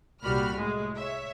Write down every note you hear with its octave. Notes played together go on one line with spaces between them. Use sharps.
C2 A#2 G3 F#4 B5 F6
A2 G#3
C#5 E5